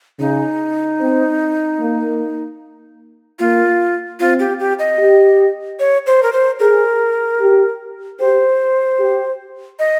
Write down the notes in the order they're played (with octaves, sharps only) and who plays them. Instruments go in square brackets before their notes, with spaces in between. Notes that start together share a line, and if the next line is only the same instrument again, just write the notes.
[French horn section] C#3 [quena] D#4
[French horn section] C4
A#3
[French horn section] A#3 [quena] F4
[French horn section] C4 [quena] F4
[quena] G4
G4
D#5
[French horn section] G4
[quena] C#5
C5
A#4
C5
[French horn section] G#4 [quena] A#4
[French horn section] G4
[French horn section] G4 [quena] C5
[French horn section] G4
[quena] D#5